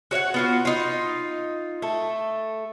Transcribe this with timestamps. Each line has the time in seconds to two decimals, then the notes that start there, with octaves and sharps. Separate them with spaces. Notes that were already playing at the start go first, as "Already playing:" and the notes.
0.11 F#4 C#5 F5 F#5
0.34 B3 F4 F#4
0.65 D#4 F4
1.82 A3 A4